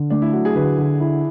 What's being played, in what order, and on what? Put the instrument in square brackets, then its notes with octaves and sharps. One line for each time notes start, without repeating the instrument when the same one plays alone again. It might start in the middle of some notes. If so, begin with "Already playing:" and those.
Already playing: [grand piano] D3
[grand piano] A3 [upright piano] D4
[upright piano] E4
[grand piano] F#3 [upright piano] F#4
[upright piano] G#4
[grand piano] D3 [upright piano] B4
[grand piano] D3
E4